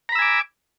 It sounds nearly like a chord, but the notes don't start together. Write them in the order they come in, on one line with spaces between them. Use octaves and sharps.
A#5 B5 E6 G#5 D6